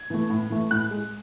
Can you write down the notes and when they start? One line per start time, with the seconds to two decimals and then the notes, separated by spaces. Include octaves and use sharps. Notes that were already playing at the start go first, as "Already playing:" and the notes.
Already playing: G#6
0.10 E3 A3
0.30 A2
0.50 E3 A3
0.71 A2 F#6
0.91 G#3